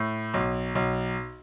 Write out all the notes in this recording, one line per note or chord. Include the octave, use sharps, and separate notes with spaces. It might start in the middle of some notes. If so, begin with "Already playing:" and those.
Already playing: A2
B1
B1